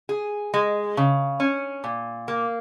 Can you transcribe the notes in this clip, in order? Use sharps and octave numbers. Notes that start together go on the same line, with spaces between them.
G#4
G#3
C#3
C#4
A#2
A#3